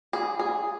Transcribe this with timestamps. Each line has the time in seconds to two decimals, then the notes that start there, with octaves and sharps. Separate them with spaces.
0.13 G#4
0.39 G#4